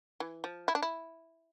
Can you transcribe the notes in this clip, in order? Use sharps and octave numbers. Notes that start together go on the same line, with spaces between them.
E3
F3
E4
D4
E4